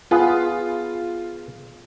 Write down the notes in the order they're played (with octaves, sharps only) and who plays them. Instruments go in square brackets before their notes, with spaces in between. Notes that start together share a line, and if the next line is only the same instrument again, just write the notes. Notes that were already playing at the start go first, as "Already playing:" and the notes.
[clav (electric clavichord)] B3 G#4 B4 [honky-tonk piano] F4